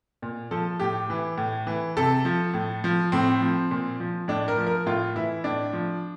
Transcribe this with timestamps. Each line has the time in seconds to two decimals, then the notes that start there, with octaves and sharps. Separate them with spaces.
0.22 A#2
0.51 F3 A4
0.80 A2 G4
1.10 E3
1.38 A2
1.67 E3
1.97 C3 A4
2.25 F3
2.54 A2
2.84 F3
3.12 A2 C4
3.41 F3
3.71 A#2
4.00 F3
4.28 A2 D4
4.48 A#4
4.57 F3
4.67 A#4
4.86 A2 F4
5.16 E3 E4
5.44 A2 D4
5.73 F3